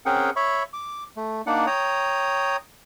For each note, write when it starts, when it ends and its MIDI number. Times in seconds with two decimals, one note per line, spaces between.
0.06 0.30 60
0.06 0.30 61
0.06 0.30 68
0.06 0.30 70
0.06 0.30 78
0.06 0.30 79
0.36 0.63 73
0.36 0.63 76
0.36 0.63 83
0.36 0.63 85
0.73 1.04 86
1.17 1.42 57
1.47 1.66 58
1.47 1.66 62
1.47 1.66 63
1.47 1.66 74
1.47 1.66 78
1.67 2.57 73
1.67 2.57 79
1.67 2.57 82
1.67 2.57 87